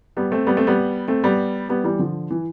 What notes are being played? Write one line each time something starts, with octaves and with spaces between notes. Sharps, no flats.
G3 B3
A3 C4
G3 B3
A3 C4
G3 B3
A3 C4
G3 B3
G3 B3
E3 G3
D3 F3
E3